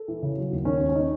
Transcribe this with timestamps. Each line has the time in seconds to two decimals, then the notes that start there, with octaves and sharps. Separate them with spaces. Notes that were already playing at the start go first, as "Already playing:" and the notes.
Already playing: A4
0.08 E3
0.22 C#3
0.37 F#3
0.51 D#2
0.65 D#3 C#4
0.80 D#2
0.89 C#4
0.95 D#4